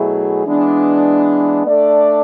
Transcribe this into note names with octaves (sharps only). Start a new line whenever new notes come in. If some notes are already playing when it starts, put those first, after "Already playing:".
Already playing: B2 F#3 A3 E4 G#4
E3 G#3 B3 D4
A3 D4 A4 D5